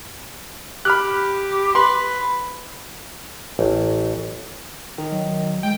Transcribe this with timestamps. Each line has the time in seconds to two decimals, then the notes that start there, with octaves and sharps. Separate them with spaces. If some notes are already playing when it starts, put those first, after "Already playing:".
0.85 G4 B5 F6 F#6
1.75 B4 C6
3.59 A1
4.98 D#3 A#5
5.12 F#3
5.63 G#3 G5